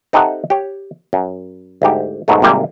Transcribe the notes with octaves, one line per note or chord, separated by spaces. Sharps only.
C4 D#4 G4 A4 E5 F#5
G4 C#5
F#2
D2 G#2 G4
G#2 B2 F#3 A3
G#1 C3 G3 A#3 G5 G#5